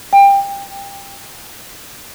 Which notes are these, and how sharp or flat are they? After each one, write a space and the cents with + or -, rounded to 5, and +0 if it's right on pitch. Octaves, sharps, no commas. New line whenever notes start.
G5 +25